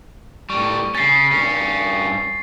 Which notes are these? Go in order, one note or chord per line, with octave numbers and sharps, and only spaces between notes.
A2 G3 C#6
C#3 C#4 A6 C7
G2 C#4